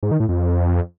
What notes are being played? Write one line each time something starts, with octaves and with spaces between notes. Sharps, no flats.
G#2
D#3
A2
F2